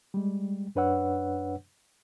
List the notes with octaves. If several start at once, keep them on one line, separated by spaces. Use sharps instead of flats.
G3 G#3
F#2 D4 B4 C#5 F#5 E6